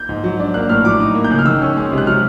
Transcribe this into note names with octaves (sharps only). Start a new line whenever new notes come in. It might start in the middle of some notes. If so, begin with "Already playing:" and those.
Already playing: G6
G#2
F#3
D4
A#3 F#6
A2 F6
F#3 D6
D#4
A#3
G6
C#3 F#6
F6
D#3 E6
C#4
G#3
C3
F#6
F#3 F6